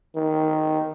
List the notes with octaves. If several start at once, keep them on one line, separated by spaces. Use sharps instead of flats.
D#3